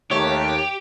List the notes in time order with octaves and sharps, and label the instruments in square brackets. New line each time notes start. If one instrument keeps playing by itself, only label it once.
[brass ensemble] D#2 [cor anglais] A3 [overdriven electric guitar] G4 [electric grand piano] C#5